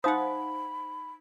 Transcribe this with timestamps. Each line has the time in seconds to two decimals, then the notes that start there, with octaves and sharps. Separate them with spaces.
0.04 D#4 C5 F5 F#5 B5 D#6